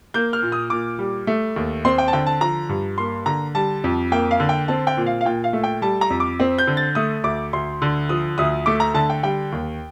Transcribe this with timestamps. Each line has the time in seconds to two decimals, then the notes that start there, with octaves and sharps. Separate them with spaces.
0.14 A#3 G6
0.33 F6
0.42 A#2
0.52 D#6
0.70 A#2 D6
0.99 G3
1.27 A3
1.56 D#2
1.85 C4 C6
1.98 G5
2.08 A5
2.13 D3 G5
2.26 A5
2.41 F3 A#5
2.69 G2
2.98 A#3 C6
3.26 D3 A#5
3.55 G3 A5
3.84 F2
4.12 A#3 G5
4.31 F5
4.40 D3
4.49 G5
4.68 C4 A5
4.87 G5
4.97 A#2
5.06 F5
5.21 F5
5.25 A#2 G5
5.44 F5
5.53 A3
5.63 G5
5.82 G3 A5
6.01 A#5
6.10 F2
6.20 D6
6.40 C4
6.58 G6
6.67 D3
6.77 A6
6.95 A3 D#6
7.24 D2 D6
7.53 D2 C6
7.82 D3
8.09 F3 D#6
8.38 D2 D#6
8.66 A3 D6
8.80 A#5
8.94 D3 A5
9.10 G5
9.23 G3 G5
9.52 D#2